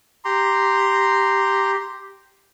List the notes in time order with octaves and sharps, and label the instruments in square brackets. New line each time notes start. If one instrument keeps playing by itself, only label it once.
[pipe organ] G4 [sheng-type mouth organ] A#5 C6